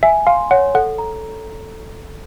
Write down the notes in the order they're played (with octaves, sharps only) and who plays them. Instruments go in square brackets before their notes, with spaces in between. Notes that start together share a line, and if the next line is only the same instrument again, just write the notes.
[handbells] E5 [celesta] G#5
[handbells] F5 [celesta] C6
[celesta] C#5 [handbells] F#5
[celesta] A4 [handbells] F#5
[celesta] A#5